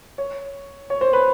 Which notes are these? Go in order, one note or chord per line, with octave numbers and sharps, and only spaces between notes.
C#5
C#5
C5
B4